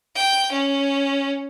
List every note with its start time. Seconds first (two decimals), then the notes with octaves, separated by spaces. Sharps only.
0.16 G5
0.52 C#4